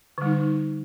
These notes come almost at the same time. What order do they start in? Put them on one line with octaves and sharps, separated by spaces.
D3 G3 D#4